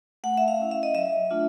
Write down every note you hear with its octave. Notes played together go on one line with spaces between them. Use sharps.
A3 F#5
E5
F5
C#4 E4
E5
D#5
F#3 E5
A3 D4 F4